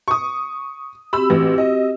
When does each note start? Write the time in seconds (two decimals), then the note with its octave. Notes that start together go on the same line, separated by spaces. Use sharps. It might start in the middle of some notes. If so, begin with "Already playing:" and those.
0.08 C#6 D#6
1.13 C4 F#4 G4 B5 E6
1.30 A1
1.58 D#5